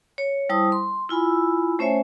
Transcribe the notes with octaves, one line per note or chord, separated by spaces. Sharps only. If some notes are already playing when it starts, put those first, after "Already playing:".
C#5
G3 E4 C5 A5 D#6
C6
E4 F4 G#5 B5 E6
A3 C#4 C5 C#5 E5 G#5